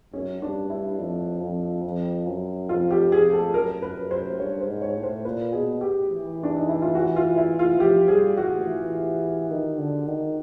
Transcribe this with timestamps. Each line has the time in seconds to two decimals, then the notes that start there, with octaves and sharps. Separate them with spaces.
0.13 F#2 C#4
0.42 G2 D4
0.70 G2 E4
0.99 F2
1.42 F2
1.84 F2
2.27 F#2
2.69 F2 F4
2.91 G4
3.12 F2 G#4
3.33 A4
3.54 F#2 A#4
3.82 B4
3.97 F#2
4.11 C5
4.39 G2 C#5
4.61 C5
4.67 G#2
4.82 C#5
4.97 A2
5.03 C5
5.25 A#2 B4
5.53 B2 G#4
5.81 G4
6.09 E3
6.43 D4
6.56 D#4
6.69 E4
6.82 F4
6.95 F#4
7.16 F4
7.38 E4
7.59 F4
7.80 F3 G4
8.08 G3 G#4
8.37 E3 F#4
8.65 E3
9.51 D#3
9.78 D3
10.07 D#3